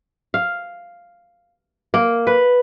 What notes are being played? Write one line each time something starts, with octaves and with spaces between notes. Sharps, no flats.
F5
A#3
B4